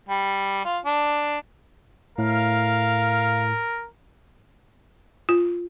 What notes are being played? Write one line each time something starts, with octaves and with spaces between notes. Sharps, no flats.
G3
F4
D4
A2 A#4 F5
F4